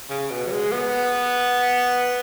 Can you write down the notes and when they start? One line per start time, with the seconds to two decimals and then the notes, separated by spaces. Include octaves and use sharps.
0.10 C#3
0.30 B2
0.47 F#3
0.51 G#3
0.72 B3